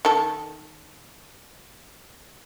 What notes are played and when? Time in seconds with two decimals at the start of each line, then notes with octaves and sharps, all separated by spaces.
0.05 D#3 A4